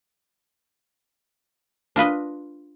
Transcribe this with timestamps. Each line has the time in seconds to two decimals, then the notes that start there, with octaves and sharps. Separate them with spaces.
1.96 D4 F4 B4 D#5